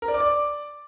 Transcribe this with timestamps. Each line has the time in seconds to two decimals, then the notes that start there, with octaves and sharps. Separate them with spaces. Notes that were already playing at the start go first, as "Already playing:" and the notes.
0.02 A#4
0.08 D5
0.14 D6
0.20 D5